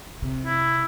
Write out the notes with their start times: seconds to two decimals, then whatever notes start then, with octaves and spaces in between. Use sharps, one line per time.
0.22 C3
0.46 E4